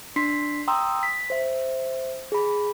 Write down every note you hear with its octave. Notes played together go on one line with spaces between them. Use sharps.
D4 C6 B6 C7
G5 A#5 C6 D#6 E6
B6
C5 E5
G#4 B5